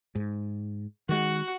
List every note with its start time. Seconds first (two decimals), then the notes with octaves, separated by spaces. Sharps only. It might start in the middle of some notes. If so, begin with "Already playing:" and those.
0.15 G#2
1.09 D#3 G#3 F#4 F#5